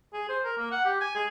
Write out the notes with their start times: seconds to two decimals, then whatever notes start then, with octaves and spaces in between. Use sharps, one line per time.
0.14 G#4
0.29 C5
0.44 A#4
0.57 A#3
0.71 F#5
0.85 G4
1.01 G#5
1.15 G#4